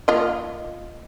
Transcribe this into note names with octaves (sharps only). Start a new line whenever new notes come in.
A#3 F4 D#5